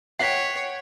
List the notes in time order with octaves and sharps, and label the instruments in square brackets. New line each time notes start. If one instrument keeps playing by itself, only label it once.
[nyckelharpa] C#5 [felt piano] F#5 G5 [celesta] B6 C7